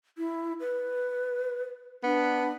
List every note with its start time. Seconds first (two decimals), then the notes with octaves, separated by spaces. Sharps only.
0.18 E4
0.60 B4
2.03 B3 D4